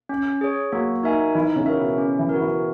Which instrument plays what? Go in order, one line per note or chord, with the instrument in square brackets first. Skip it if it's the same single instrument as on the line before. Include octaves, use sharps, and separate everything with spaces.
[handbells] C#4
G#4 C#5
[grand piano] F#3 F#4 [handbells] A#3
[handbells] D#4 A#4 E5 G#5
[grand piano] E3 E4 [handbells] D#4
[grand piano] C#3 C#4
[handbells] F#4 A#4 E5
[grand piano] B2 B3
[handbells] C#4
[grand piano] E3 E4
[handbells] F#4 A#4
[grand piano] E3 E4